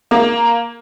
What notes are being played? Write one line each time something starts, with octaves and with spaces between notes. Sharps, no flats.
A#3